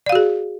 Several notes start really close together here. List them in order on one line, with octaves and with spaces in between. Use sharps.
D5 F5 F#4 G#4